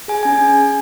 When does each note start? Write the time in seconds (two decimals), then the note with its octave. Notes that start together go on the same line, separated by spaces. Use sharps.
0.08 G#4 G#5
0.23 C#4 G#5